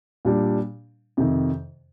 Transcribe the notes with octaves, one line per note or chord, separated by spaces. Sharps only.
A#2 G3 D4
F2 C3 D#3